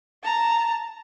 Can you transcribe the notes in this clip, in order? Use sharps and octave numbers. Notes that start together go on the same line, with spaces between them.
A5 A#5